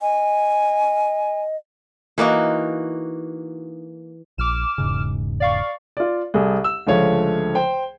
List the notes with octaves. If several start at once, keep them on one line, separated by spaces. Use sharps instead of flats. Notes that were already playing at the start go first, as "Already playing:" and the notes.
D#5 G#5
E3 A#3 D#4 F#4
A#1 D6 F6 E7
E1 G#2 C#3
D5 F5 C#6
F4 D5
C2 G#4 A4
E6
C#2 D3 F3 A3 C#5 F5
C5 G5